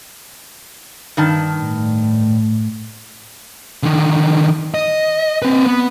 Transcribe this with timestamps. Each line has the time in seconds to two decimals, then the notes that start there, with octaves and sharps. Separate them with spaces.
1.17 G2 D#3 A5
1.59 A2
3.83 D3 D#3
4.74 D#5
5.42 C4 B4
5.66 B3